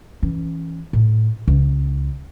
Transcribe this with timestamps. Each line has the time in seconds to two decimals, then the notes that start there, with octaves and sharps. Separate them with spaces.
0.23 E3 C#4
0.93 A2
1.48 C#2